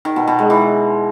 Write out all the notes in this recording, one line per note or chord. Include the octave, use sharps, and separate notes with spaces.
D#3
B2
B2
G#3
E3